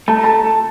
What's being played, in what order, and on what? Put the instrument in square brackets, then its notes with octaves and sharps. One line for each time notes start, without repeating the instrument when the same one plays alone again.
[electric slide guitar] A3 [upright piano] A5
[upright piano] A#5
[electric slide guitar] A4 [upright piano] A5
[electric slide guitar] A4